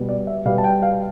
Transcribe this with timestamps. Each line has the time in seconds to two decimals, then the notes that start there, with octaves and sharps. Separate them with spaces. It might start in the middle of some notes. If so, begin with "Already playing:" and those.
Already playing: B2 G3 B3
0.09 D5
0.27 E5
0.45 B2 G3 B3 F5
0.58 A5
0.64 G5
0.83 F5